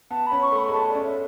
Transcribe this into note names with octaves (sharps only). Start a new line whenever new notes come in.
B3 A5
B5
C#4
C#6
A3
B5
G#3
A3 A5
D5
C#4
E5